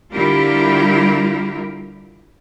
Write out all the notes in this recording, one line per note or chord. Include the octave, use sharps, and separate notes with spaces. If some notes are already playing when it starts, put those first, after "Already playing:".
D3 G3 E4 F4 G4 A#4